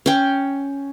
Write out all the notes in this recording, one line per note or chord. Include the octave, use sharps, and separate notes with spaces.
C#4 G5